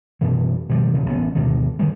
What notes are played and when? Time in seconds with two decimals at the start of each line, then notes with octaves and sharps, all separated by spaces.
0.21 F#2 B2 E3
0.69 B2 D#3 F3 G3
0.94 D#1 C#3
1.06 A1 B3
1.35 D2 G2 B2 D#3
1.79 D3 D#3 G3 G#3